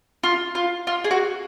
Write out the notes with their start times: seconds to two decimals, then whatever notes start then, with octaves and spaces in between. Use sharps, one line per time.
0.23 F4
0.55 F4
0.87 F4
1.04 G#4
1.11 F#4